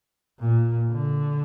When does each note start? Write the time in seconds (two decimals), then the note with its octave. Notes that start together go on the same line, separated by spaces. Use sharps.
0.39 A#2
0.91 D3